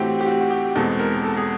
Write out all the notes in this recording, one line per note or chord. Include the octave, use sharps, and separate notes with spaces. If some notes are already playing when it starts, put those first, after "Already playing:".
Already playing: A2 E3 A3 C4 F#4 G4
G4
F#4
F#4
G4
E2 B2 G#3 C4 A4
A#4
A4
G#4